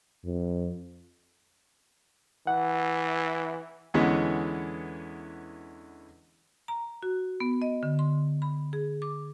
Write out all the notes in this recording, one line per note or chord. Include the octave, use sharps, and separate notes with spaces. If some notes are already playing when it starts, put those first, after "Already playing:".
F2
E3 F#5
E2 D3 E3 G#3 B3 C#4
A#5
F#4
B3
D#5
D3
C6
B5
G#4
D6